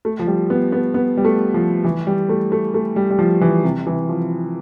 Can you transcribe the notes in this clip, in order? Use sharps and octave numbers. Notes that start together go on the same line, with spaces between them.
A3
F3
G3
B3
B3
B3
G3
A3
F3
E3
G3
A3
A3
A3
G3
G3
F3
E3
C3
E3
F3